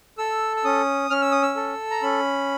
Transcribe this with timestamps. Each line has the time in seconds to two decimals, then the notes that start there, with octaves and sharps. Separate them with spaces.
0.18 A4 E6
0.56 E6
0.64 C#4 D#6
1.10 C#4 F6
1.21 E6
1.31 D#6
1.42 E6
1.56 A4
1.91 A#5
2.02 C#4 B5